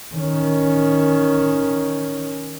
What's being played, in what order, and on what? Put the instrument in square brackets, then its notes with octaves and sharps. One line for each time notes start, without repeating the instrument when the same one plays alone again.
[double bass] D#3 C#4